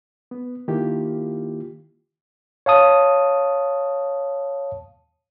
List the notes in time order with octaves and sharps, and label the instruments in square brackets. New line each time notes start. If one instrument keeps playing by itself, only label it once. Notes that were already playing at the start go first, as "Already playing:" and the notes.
[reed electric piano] B3
D#3 A#3 E4 F4 G4
[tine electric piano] C#5 F5 A5 D#6